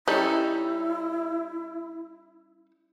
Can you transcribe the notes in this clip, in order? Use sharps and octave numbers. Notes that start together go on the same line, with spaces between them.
G3 C#4 D#4 E4 A4